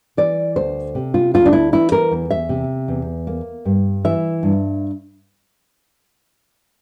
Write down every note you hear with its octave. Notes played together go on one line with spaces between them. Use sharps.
E3 D5
D2 C5
C3
F4
D2 F4
D4
E4
E3 E4
A#4
E2
E5
C3
E2
A#3
G2
E3 E5
G2